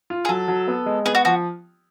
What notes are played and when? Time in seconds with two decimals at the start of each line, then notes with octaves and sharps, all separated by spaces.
0.10 F4
0.25 G#4
0.29 F#3 A4
0.48 F#3
0.68 B3
0.86 G#3
1.06 B3 G#4
1.15 F#4
1.25 F3 F#4